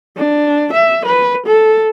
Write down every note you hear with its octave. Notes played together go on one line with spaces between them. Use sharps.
D4
E5
B4
A4